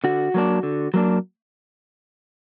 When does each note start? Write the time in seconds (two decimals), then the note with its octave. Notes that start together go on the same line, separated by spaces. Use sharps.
0.04 D3 F#4
0.34 F#3 A#3 D4
0.63 D3
0.94 F#3 A#3 D4